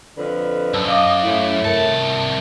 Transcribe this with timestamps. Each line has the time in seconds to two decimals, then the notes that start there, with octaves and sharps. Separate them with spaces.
0.17 F2 D3 B4
0.74 F#2 A5 E6
0.88 D#5 F5 D6
1.24 A3 C#4 E4
1.65 C2 A#4 E5 A5 C#7